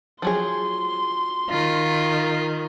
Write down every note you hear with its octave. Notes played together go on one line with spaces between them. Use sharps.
F3 F#3 G#4 C6
D#3 F4